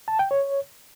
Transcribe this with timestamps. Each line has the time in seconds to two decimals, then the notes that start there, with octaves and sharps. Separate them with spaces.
0.08 A5
0.19 G5
0.31 C#5